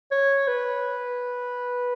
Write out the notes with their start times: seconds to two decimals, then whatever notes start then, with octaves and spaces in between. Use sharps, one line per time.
0.11 C#5
0.48 B4